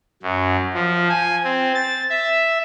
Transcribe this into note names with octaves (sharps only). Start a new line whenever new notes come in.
F#2
F3
G#5
C4
A6
E5